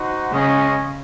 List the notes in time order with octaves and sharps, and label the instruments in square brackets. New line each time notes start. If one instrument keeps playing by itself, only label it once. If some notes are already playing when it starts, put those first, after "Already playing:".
Already playing: [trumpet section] D#4 F#4 C5 F#5
[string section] C#3 [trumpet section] G#3 C#4 G#4 D#5